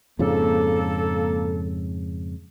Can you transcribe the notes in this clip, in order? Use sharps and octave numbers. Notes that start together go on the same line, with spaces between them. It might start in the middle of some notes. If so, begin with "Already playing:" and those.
F2 G#2 C#3 A#3 A4